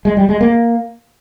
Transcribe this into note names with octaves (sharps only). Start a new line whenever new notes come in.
G#3
G3
G#3
A#3